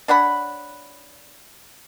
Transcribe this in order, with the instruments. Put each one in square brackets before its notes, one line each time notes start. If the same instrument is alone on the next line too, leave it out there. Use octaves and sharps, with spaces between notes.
[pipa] D4 C#5 F#5 B5